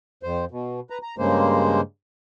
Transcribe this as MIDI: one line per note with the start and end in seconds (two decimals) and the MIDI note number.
0.23 0.45 41
0.23 0.45 72
0.51 0.80 47
0.90 0.98 71
0.90 0.98 82
1.03 1.15 82
1.18 1.81 43
1.18 1.81 49
1.18 1.81 56
1.18 1.81 58
1.18 1.81 72